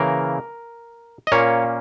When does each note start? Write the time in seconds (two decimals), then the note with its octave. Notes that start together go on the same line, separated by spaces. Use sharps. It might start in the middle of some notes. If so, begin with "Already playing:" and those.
Already playing: C#3 E3 A#3 A#4
1.27 D#5
1.32 A#2 A#3 C#4 C#5